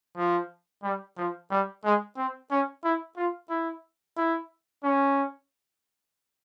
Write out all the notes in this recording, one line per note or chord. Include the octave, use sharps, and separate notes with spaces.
F3
G3
F3
G3
G#3
C4
C#4
E4
F4
E4
E4
C#4